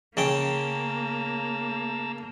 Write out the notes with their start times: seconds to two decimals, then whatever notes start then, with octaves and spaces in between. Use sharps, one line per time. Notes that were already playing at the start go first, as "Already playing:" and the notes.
0.17 C#3 A#3 C#4 G5 A5 A#5 E6